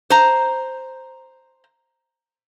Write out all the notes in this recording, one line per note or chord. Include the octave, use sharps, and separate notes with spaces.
C5 A#5